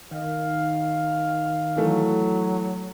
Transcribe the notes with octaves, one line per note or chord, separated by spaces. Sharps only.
D#3 F5
E3 F#3 A3